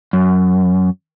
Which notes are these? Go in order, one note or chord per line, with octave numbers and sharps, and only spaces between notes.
F#2